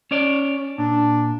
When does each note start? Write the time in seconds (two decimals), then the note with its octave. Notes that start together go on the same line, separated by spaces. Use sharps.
0.11 C#4 C#5 D5
0.78 A#2 D4